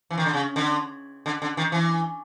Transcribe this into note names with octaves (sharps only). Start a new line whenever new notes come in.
E3
D#3
D3
C#3
D3
D3
D3
D#3
E3